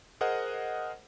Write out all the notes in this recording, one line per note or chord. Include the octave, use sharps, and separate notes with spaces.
G#4 A#4 C5 D#5 F#5